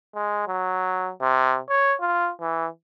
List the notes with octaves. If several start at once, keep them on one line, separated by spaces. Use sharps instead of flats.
G#3
F#3
C3
C#5
F4
E3